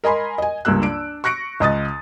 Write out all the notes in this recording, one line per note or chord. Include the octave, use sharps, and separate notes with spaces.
A#4 D#5 G#5 B5 C6
D#5 G#5
C#2 G2 A#3 E6 F#6
D4 D7
C#6 F#6 A#6 C#7 D7
C#2 D#5 D#6 A6